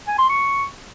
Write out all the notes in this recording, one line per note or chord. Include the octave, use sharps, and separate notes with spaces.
G#5
C6
C#6